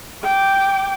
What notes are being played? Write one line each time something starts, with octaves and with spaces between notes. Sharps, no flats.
G5 D6